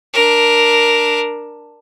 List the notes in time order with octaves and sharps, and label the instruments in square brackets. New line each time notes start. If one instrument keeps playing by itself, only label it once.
[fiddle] D4 A#4